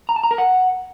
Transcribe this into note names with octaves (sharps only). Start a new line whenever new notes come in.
A#5
A5
A#5
A#4
F#5